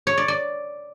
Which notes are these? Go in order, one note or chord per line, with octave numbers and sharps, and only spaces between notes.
C#5
D5
D5